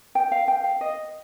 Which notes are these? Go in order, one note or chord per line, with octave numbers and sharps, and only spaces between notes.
G5
F5
G5
F5
D#5